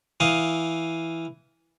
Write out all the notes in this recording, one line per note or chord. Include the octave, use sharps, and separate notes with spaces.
E3 F5 D#6